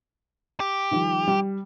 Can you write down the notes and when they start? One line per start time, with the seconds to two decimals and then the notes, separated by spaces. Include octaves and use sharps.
0.60 G4
0.91 D#3 F3 G3
1.28 G3